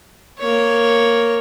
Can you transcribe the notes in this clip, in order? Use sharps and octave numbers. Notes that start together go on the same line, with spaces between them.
A#3 C#5